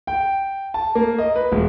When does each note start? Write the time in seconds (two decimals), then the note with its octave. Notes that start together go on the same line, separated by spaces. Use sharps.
0.07 G5
0.74 A5
0.95 A#3
1.18 D#5
1.36 B4
1.52 E1